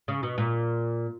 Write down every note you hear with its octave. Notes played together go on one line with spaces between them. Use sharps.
C#3
B2
A#2